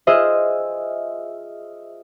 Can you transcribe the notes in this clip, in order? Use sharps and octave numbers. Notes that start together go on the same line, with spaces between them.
F4 G#4 C5 D#5 E5